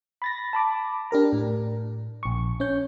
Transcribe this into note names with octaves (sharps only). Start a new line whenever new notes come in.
B5 A6 A#6
A5 B5 D6
D4 G4 A#4 A#5
A2
A#1 C#6
C#4 C#5 G6